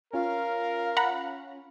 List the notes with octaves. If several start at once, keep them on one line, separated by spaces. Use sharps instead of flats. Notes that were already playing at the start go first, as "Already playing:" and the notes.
C#4 F4 A#4 F5
F#5 A#5 B5